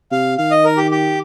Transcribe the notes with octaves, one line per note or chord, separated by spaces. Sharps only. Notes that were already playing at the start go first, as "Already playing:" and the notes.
C3 F5
D#3 F5
D#5
A#4
G4
G4